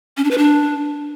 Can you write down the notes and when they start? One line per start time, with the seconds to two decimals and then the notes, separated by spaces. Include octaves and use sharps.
0.17 C#4
0.24 D4
0.31 B4
0.38 D4